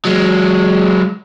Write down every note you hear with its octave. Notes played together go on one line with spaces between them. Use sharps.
F#3 G#3